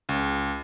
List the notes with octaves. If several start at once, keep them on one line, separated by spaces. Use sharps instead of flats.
C#2